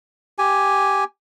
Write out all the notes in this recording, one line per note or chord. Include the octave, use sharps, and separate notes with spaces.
G4 G#5